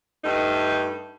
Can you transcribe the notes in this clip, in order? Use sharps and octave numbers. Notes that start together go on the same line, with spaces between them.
G2 A3 D#4